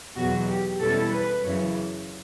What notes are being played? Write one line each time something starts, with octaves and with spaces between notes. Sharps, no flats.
E2 B2 F#3 F#4
G4
E2 B2 G3 C#4 E4 A4
B4
F#2 C#3 E3 C#5